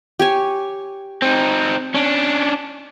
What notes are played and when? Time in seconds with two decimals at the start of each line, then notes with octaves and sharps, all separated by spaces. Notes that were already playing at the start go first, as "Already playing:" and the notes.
0.19 G4 C#5 G#5
1.22 C4 D#4
1.95 C#4 D4